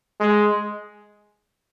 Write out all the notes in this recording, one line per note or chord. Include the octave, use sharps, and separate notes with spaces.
G#3